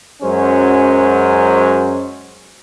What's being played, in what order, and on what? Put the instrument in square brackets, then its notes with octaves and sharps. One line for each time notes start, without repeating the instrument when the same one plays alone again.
[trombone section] F#2 F#3 G#3 C#4 C5